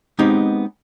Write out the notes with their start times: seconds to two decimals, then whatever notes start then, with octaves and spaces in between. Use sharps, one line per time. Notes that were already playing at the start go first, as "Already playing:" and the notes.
0.19 G#3 B3 C4 D#4 G4